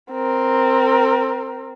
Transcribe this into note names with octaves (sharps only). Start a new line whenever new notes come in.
C4 A#4